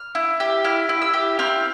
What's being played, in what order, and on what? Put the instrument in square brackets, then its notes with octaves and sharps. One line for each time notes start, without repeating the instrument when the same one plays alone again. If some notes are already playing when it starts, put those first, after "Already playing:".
Already playing: [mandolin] F6
E4
G4
E4 F6
E4
E6
G4
C4 F6